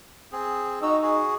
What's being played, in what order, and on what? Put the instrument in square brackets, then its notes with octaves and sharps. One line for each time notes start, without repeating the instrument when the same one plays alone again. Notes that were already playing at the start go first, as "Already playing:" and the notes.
[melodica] C4 G#4
[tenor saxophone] D#4 [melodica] F#4 E6
[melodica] F#4 G#4